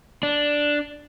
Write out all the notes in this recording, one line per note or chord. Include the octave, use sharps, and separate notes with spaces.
D4